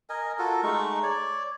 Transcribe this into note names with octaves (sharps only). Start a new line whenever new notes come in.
A#4 D#5 G#5
F4 F#4 A4 A#4
G#3 A3 D#4 C#6
C#5 D5